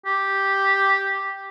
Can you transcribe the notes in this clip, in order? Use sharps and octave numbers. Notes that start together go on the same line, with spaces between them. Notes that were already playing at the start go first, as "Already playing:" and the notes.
G4